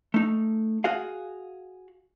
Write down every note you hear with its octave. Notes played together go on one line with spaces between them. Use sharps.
A3 D#4
F#4 G#4 F5